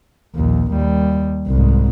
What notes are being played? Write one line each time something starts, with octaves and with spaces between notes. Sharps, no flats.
A#1 D#2
D#2 G3
C2 G#2